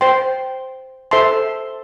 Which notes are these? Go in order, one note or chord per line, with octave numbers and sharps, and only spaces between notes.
C5 G5 C6
A4 C5 E5 A5 C6